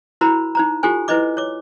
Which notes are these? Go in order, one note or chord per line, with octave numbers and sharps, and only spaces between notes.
E4 F#4 A#4 C5 A#5 B5
D#4 C5 A#5
F4 G4 A4 C5 G#5
E4 B4 C5 D#5 D6
C#5 D6